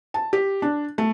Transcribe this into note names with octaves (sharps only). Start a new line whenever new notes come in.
A5
G4
D4
A3